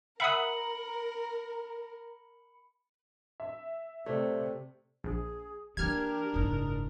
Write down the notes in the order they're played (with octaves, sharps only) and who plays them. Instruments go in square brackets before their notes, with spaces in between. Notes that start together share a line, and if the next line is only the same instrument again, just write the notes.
[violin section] A#4 [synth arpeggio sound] E5 F#5 D#6 [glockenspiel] B5 C#7 F#7
[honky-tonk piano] E5
[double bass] C3 [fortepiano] A3 [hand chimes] C5 D5
[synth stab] A#1 [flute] G#4
[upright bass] E3 A#3 [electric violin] D4 A#4 [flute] G4 [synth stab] F6 G#6
[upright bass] F#1 G#2 [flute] D#6